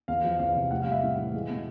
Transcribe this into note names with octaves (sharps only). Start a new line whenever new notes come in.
E2 F5
F3
E2 F5
C3
A2 F#5
F5
G3
E5
A2
E3
G#3
B2